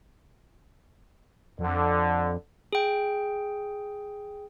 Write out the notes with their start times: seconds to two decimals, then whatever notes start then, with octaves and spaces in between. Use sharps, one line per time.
1.59 F2 D3
2.73 G#4 G5